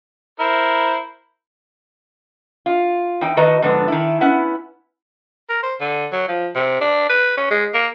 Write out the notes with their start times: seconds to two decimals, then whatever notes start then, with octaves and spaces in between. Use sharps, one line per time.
0.40 E4 A#4 C5
2.66 F4
3.21 E2 D#4 G5
3.37 A2 D#3 F#4 B4 D#5 A#5
3.62 G#2 D3 F3 B3 D4
3.88 D#3 E4
4.21 B3 C#4 E4 F#5
5.50 A#4
5.63 C5
5.80 D3
6.12 F#3
6.28 F3
6.55 C3
6.81 D4
7.09 B4
7.37 C#4
7.51 G#3
7.74 A#3